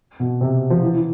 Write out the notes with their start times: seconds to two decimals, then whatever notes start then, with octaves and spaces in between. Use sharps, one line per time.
0.20 B2
0.41 C3
0.70 F3
0.82 E3
0.94 E3